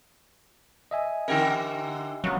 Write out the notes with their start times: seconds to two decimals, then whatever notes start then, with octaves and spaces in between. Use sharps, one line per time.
0.91 D#5 E5 G#5
1.28 D3 C#4 G4 A#4 G5
2.24 C#3 F#3 B3